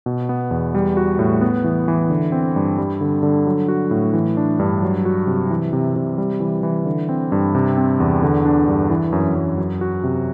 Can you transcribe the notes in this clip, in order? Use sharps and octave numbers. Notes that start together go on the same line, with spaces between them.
B2
B3
E2
G3
F#4
A2
B3
E3
E3
D3
C4
G2
G3
D3
D3
F#3
F#4
A2
E3
D4
G2
F#3
F#4
C3
E3
C3
C3
G3
E3
E3
D3
C4
G2
C3
C4
E2
D3
D4
G2
E3
F#2
F#2
F#3
F#4
C3